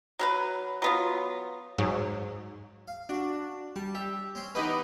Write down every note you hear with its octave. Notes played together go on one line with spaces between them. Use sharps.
F#3 A#4 B4
F#3 B3 F4
G#2 F#3
F5
D4 F#4
G3 A5
G4 E5
C4 C#4 C6
E3 B3 D#4 G4 B4 D#5